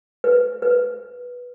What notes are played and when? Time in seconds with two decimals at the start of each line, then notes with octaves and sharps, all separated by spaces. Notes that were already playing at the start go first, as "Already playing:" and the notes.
0.24 B4
0.62 B4